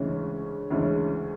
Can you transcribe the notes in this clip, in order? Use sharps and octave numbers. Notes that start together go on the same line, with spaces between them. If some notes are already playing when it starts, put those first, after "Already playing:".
Already playing: D2 C#3 E3 G#3 C#4
D2 C#3 E3 G#3 C#4